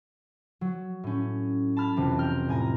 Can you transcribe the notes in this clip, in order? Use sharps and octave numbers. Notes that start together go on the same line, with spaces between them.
F#3
A2 C#4
A5 B5 F6 G#6
F1 B1 F2 C3 E3
A#4 G5 F6
A2 G#5 A#5